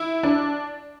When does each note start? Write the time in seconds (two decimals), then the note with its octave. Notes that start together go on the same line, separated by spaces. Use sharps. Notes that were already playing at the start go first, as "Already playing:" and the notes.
Already playing: E4
0.23 D4